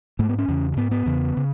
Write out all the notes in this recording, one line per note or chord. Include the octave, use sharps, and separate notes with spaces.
G#2 A3
B3
C#4
E2 C#3
G#2 B3
B3
E2 C#3
C#3